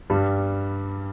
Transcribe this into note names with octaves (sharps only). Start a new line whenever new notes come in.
G2 G3